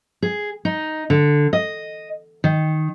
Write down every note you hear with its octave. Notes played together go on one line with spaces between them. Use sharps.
G#4
D#4
D3
D#5
D#3